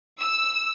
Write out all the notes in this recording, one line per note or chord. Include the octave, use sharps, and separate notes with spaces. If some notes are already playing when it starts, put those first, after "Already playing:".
E6